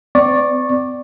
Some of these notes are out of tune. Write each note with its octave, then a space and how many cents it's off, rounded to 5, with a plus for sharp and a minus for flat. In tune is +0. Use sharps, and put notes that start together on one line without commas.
C4 -40 D5 +0 C#6 -20